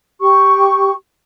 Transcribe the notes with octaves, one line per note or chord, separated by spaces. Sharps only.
G4 C#6